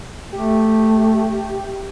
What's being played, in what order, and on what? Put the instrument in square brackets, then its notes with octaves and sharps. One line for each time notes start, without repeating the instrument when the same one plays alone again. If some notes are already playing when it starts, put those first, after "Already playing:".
[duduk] A3 [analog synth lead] G4